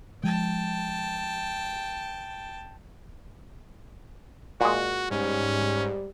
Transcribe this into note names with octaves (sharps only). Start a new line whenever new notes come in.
F3 G#3 G5 A5
A#2 G#3 F#4
G#2 G3 C#4